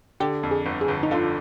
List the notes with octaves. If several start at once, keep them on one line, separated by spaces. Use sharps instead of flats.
D3 G4
F2
G#4
G1
G#4
G1
D#4
D3 F4